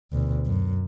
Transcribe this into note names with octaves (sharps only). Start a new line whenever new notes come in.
D2 B2
F#2